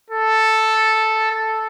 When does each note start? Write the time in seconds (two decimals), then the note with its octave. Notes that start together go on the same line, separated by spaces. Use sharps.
0.10 A4
1.31 A4